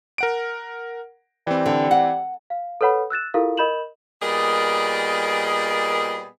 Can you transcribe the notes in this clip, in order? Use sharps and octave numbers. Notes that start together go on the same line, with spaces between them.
A#4 F#5 D7
E3 G3 C4
D3
F#5
F5
A4 B4 C#5 F#5 B5
E6 F#6 A6 E7
E4 F4 G4 A4 A#4 F5
A#4 D#5 B5 G6 E7 F#7
A#2 G3 B3 G#4 A#4 D#5